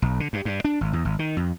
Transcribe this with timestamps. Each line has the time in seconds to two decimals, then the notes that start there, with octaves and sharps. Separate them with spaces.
0.02 B1
0.20 D3
0.33 G2
0.45 G2
0.65 D4
0.81 G#1
0.93 E2
1.05 G#1
1.19 D#3
1.37 F2